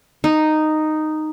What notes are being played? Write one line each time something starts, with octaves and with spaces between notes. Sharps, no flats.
D#4